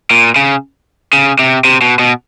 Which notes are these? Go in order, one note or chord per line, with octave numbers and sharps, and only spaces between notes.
A#2
C#3
C#3
C3
C3
B2
B2